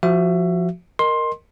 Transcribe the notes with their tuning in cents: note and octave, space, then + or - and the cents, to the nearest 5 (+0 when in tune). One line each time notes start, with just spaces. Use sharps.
F3 +0 F#4 +10 E5 +25
A#4 +0 D#5 -10 C6 +15